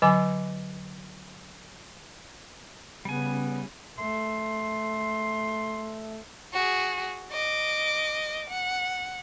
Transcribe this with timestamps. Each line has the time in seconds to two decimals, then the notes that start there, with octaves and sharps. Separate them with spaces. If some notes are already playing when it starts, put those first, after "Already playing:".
0.02 D3 F#3 G#5 D6
3.05 C#3 G3 B3 G#5
3.98 A3 C6
6.53 F#4 G#4
7.31 D#5 D6
8.50 F#5